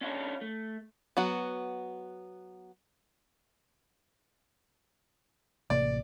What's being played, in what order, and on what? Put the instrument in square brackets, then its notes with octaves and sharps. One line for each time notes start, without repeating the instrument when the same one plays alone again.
[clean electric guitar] C#4 D4 F4 F#4 A4 C#5
A3
[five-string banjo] F#3 B3 F#4
[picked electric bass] A1 C3 A#3 [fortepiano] D5